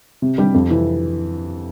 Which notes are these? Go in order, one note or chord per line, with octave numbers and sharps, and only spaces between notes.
C3
G3 D4 G4
F2
C3 E3